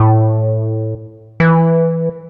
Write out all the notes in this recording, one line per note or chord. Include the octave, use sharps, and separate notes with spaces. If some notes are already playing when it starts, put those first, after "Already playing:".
Already playing: A2
E3